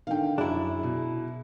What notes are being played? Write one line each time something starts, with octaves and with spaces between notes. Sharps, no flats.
D3 D#3 F5 G5
F#2 D4 E4 G#4
B2